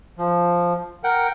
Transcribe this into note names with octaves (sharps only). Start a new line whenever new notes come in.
F3
A#4 F#5 G5